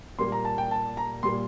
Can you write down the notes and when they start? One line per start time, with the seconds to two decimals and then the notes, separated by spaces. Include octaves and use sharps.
0.19 A#2 G3 A#3 C6
0.32 A#5
0.45 A5
0.58 G5
0.71 A5
0.97 A#5
1.23 A#2 G3 A#3 C6